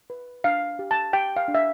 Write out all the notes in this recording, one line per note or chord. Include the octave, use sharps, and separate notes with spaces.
B4
D4 F5
G4
A5
G4 G5
F5
D4
E5